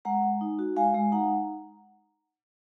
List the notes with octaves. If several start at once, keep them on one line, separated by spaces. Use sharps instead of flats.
G#3 F#5 A#5
G#3
D#4
F#4
G#3 F5 G#5
G#3
D#4 F#5 A#5